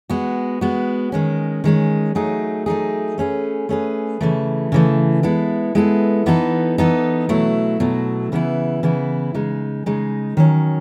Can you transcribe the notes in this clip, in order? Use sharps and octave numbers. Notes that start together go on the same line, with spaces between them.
G#3 B3 F#4
G#3 B3 F#4
D#3 G#3 C#4
D#3 G#3 C#4
F#3 A3 D#4 G#4
F#3 A3 D#4 G#4
A3 C#4 G#4 B4
A3 C#4 G#4 B4
C#3 E3 A3
C#3 E3 A3
G#3 B3 E4 A4
G#3 B3 E4 A4
E3 B3 D#4 A4
E3 B3 D#4 A4
B2 F#3 A3 E4
B2 F#3 A3 E4
C#3 E3 B3 E4
C#3 E3 B3 E4
C#3 G#3 D#4
C#3 G#3 D#4
D#3 F#3 C#4